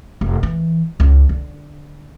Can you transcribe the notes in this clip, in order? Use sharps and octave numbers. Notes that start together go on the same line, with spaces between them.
F1
E3
C#2
D3